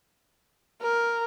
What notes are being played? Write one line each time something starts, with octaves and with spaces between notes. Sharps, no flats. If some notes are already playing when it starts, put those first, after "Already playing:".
A#4